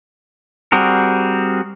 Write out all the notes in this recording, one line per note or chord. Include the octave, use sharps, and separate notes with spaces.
G3 C4 F#4 G#4 A#4